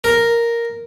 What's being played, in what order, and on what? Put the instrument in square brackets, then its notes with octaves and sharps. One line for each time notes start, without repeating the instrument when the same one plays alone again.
[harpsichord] A#4